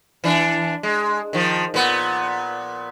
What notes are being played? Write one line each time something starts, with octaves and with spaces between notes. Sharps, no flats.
E3 D4
G#3
D#3 F3
A#2 B3